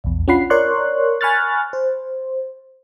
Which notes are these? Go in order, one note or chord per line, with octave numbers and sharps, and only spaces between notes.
A#1 E2
C#4 D4 F4 F#5 B5 C7
A#4 C#5 D5 C6 C#6 F#6
G#5 B5 C#6 F6 F#6 A6
C5